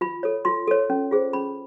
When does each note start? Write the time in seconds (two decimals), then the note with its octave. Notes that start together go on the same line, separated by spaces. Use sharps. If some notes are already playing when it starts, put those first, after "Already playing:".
0.01 F4 B5
0.23 A4 C#5
0.45 F4 C6
0.68 A4 C#5
0.90 C#4
1.11 F4 G#4 C5
1.33 C#4 B5